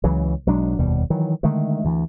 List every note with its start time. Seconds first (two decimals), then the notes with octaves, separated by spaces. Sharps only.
0.04 C#2 C#3 E3 F#3
0.47 B1 F#3 G#3 D4
0.79 F1 D#2 B2 G3
1.10 D#3 E3 F#3
1.43 D3 D#3 G#3 A3
1.85 D2 E3